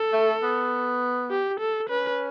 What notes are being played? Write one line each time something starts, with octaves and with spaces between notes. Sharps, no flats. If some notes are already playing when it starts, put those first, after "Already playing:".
Already playing: A4
A3
B3
G4
A4
C#4 B4